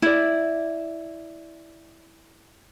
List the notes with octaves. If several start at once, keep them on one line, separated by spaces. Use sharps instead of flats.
E4 D5